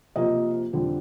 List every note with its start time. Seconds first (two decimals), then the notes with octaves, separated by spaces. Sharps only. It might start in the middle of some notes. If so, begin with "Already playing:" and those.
0.16 C3 F3 A#3 F4 D#5
0.73 F2 D3 G3 C4 F4